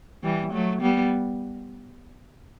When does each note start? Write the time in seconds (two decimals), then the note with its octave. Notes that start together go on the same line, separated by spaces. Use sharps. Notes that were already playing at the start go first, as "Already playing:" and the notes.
0.23 E3 G3
0.52 F#3 A3
0.81 G3 B3